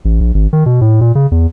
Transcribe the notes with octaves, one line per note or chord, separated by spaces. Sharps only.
A1
A#1
G#1
D#3
B2
A2
A#2
C#3
E2